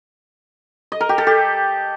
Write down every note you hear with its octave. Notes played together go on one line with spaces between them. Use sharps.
D#5
A#4
G4
A4
G4